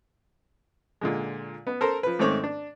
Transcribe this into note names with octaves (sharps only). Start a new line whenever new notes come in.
A#2 D3 G#3
B3
A4 A#4 C5
F3 B4
G#2 D#3 A3 C4 C#5 D6
D4